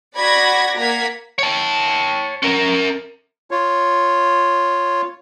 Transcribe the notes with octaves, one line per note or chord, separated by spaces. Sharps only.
F#4 D5 F#5 B5 G#6 A#6
A#3 F#5 A#5 G#6 B6
C#5 A5
C#4 A#4
F4 C#5